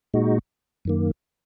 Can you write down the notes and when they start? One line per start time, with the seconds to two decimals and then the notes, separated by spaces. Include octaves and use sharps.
0.14 A#2 G#3 D#4 F#4
0.85 F#2 D#3 A#3